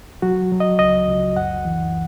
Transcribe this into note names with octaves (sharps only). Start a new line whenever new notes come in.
F#3 F#4
F#3
D#5
C#2 D#5
C#2
F#2 F#5
E3